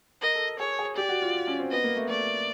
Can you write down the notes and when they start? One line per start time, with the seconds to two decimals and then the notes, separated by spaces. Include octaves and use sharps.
0.22 A#4 D#5
0.35 A4
0.60 G#4 C#5
0.79 G#4
0.97 G4 D5
1.09 F#4
1.22 F4
1.34 F4
1.47 C#4
1.59 C4
1.72 B3 D#5
1.84 A#3
1.96 A3
2.09 A3 D5